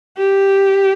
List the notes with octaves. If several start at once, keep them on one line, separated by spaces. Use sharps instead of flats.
G4